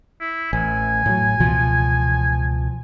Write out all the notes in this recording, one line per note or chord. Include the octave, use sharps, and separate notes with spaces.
E4
A1 G#5
A2 F#3
C#2 B2 E3 F3